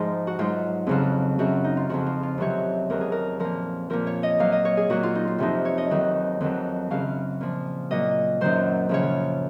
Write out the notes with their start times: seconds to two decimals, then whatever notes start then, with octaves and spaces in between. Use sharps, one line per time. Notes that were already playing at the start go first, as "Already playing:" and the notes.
Already playing: G#2 F3 D#4 G#4
0.27 F#4
0.39 G#2 F#3 F4
0.87 F2 C#3 F#3 F4
1.39 F#2 C#3 F#3 F#4
1.64 D#4
1.77 F4
1.89 F2 C#3 F3 F#4
2.06 F4
2.23 F4
2.38 F2 C3 D#3 F#3 C#5
2.90 F2 D#3 F#3 A#4
3.01 G#4
3.12 A#4
3.40 A#2 F3 A#4
3.90 A#2 F3 A#4
4.07 C#5
4.23 D#5
4.40 A#2 F#3 F5
4.52 D#5
4.65 C#5
4.77 G#4
4.90 A#2 F#3 F#4
5.03 F4
5.15 D#4
5.27 F4
5.38 F2 C3 F3 D#4
5.65 C#5
5.78 D#5
5.90 F2 D#3 F#3
6.41 F2 D#3 F#3
6.90 F#2 C#3 F#3 F5
7.41 A#2 F3
7.91 A#2 F#3 D#5
8.41 F#2 D#3 F#3 C5
8.89 F#2 C#3 F3 C#5